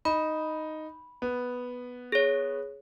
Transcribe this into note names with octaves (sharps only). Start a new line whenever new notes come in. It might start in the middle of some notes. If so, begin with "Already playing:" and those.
D#4 B5
B3
G#4 C#5